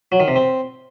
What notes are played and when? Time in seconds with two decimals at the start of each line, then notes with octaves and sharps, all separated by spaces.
0.12 F#3
0.20 D#3
0.28 C3
0.36 C4